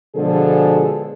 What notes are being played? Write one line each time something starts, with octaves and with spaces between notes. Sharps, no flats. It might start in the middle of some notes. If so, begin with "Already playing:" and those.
B2 D3 F3 G#3 G#4 A4